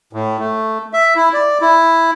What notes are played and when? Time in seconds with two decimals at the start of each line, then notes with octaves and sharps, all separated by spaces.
0.13 A2
0.39 A3
0.93 E5
1.16 E4
1.34 D5
1.61 E4